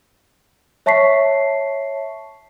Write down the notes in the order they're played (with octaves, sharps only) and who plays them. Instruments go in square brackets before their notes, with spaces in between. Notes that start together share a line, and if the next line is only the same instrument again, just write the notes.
[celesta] C#5 E5 A5 C#6 B6 C7